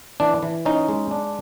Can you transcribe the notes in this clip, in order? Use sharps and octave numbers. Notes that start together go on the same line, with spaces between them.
E3 D4
E3
C#4 D#4
G#3
D4